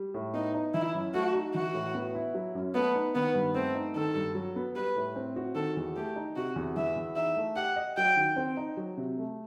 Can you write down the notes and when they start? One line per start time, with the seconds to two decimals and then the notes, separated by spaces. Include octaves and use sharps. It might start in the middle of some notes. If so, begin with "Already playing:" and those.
Already playing: G3
0.14 A2
0.34 B3 D#4
0.54 D#4
0.74 E3 E4
0.95 F#2
1.14 A3 F#4
1.34 D#4
1.54 E3 F#4
1.74 A2
1.95 B3
2.15 E4
2.34 F#3
2.55 F#2
2.74 A3 B3
2.95 D#4
3.15 D#3 B3
3.34 G2
3.55 A3 C4
3.75 D#4
3.96 D#3 A4
4.15 G2
4.35 F#3
4.56 B3
4.76 G3 B4
4.96 A2
5.16 C4
5.36 F#4
5.55 D#3 A4
5.77 E2
5.96 A3 G4
6.16 D#4
6.36 C3 F#4
6.56 E2
6.76 E3 E5
6.96 E2
7.16 D#4 E5
7.36 A3
7.56 G4 F#5
7.76 D#5
7.97 F#3 G5
8.17 D#3
8.36 C4
8.57 D#4
8.77 F#3
8.97 C3
9.18 A3